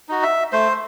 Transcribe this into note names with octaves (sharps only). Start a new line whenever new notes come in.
D#4 F#4
E5
A3 C5